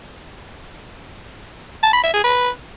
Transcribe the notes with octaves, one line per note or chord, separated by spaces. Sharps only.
A5
B5
E5
G#4
B4